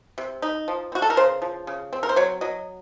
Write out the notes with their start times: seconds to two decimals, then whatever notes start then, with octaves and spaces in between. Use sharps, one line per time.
0.18 C3
0.42 D#4
0.68 F3
0.92 C4
0.95 F#4
1.02 A4
1.10 A#4
1.17 C#3 C5
1.42 F3
1.67 C#3
1.93 C4
2.03 A#4
2.09 C5
2.16 F#3 C#5
2.41 F#3 D#5